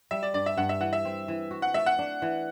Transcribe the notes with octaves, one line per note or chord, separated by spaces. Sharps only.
G3 E5
D5
G2 D5
E5
G2 F#5
E5
E3 F#5
E5
C4
E3
F#4
F#5
A3 E5
F#5
D4
E3